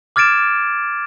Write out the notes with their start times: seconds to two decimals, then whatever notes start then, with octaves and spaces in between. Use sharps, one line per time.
0.16 D6 F6 G#6 A6 D7 E7